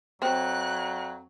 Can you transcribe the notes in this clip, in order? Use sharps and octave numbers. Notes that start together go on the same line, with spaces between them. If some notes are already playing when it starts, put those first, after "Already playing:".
F2 F#3 C4 F#6